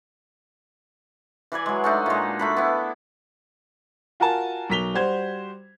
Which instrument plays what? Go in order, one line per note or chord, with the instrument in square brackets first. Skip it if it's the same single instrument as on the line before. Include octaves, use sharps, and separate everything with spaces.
[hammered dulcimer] E3 B4 D5 G#5
F#3 G#3
A3 D4 D#4
A#2 G#3
A3 D4 B5
B3 E4
[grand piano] F4 F#4 A#4 G#5 A5
B1 A#4 B6 F7 G7
G3 F#4 C5 G#6